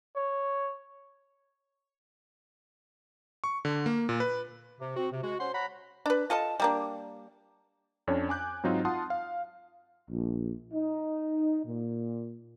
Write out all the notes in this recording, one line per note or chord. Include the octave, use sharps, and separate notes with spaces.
C#5
C#6
D3
A#3
A#2
B4
C3
C4 F#4
C3
G#3 F#4
C#4 C5 F#5 C6
C#5 F#5 A#5 B5
D4 B4
F4 A4 D#5 A5
G3 A#3 D4
F2 C#4 D4 C#5
G#5 D6 F#6 G6
G#2 F#3 C4 D#4 F4
F4 F#5 A5 C6 D#6
F5
A#1
D#4
A#2